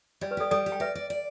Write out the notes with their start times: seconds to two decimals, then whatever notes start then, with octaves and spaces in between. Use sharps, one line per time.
0.21 G3 D5
0.31 B4
0.37 G4 A4 D5
0.51 G3 A4 D5
0.66 G4
0.72 G5
0.80 B4 D5 E5
0.95 D5
1.10 D5